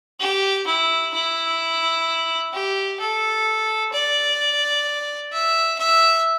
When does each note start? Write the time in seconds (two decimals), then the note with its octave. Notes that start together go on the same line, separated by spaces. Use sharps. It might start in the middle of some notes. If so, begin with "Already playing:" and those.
0.20 G4
0.67 E4
1.13 E4
2.53 G4
3.00 A4
3.93 D5
5.32 E5
5.78 E5